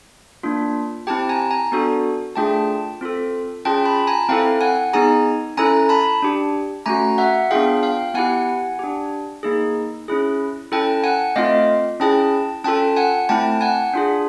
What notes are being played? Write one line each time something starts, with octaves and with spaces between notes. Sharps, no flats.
A#3 D4 F4
C4 E4 G4 G5 A5
G#5 A#5
G#5 A#5
B3 D4 F#4 A4
A3 D4 F4 G#4 G5 A5
C4 F4 A4
C#4 F4 G#4 G5 A5
A5 B5
G#5 A#5
C4 E4 A4 F5 G5
F#5 G#5
B3 D#4 G#4 G#5 A#5
C#4 E4 A4 G#5 A#5
A5 B5
D4 G4
A3 C#4 F#4 G#5 A#5
E5 F#5
B3 D4 F4 G#4 F5 G5
F5 G5
B3 E4 G4 F#5 G#5
D4 G4
A#3 D#4 G#4
C#4 E4 G#4
C#4 E4 A4 G5 A5
F#5 G#5
A3 C4 F4 D#5 F5
C#4 E4 G#4 G5 A5
C#4 F4 A4 G5 A5
F#5 G#5
A3 C4 E4 G5 A5
F#5 G#5
D4 F4 G#4